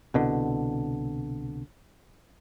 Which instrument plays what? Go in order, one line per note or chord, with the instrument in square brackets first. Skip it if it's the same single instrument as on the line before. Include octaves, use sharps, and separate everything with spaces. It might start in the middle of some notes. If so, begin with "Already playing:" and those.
[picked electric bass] C2 B2 D3